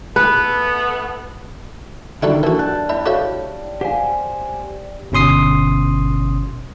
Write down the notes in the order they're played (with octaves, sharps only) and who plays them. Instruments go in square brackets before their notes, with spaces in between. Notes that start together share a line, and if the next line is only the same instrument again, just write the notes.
[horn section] A3 B3 [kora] B4
[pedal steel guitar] D3 D#3 [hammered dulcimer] G3 [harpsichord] E4 F#4 A4
[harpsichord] E3 F#4 [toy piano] D4 A#4 [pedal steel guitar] A4
[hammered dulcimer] A5 [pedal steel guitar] F#6 G6
[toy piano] E4 D5 B5 [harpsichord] E5
[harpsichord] F#4 A4 E5 [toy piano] C#5 F5 D6
[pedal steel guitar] G4 C5 G#5 [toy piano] F5 F#5
[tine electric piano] G1 B2 C#4 C6 D#6 C7